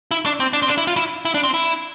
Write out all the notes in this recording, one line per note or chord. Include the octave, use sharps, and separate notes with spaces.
E4
D4
C4
D4
C4
D4
E4
F4
E4
E4
D4
C4
E4